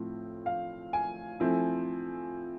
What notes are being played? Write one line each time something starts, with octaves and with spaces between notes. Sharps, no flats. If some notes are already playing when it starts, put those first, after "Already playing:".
Already playing: A2 F3 A3 C4 E4
F5
G#5
F3 A3 C4 E4